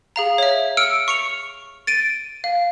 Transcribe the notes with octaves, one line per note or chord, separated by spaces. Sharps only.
G#4 F5 A#5
C#5 E5
E6 F6 C#7 D7
C#6 C#7 F7
A6 D7 D#7
F5